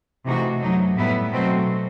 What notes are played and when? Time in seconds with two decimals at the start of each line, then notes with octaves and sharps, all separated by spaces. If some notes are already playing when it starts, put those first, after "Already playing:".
0.25 C3 E3 A3 D#4 F#4
0.60 F#2 F#3 A3 D#4
0.96 A2 G3 B3 E4 B4
1.32 B2 F#3 A3 C4 F#4